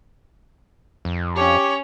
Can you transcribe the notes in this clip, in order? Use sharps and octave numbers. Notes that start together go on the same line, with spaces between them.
F2
C#4 G4 C#5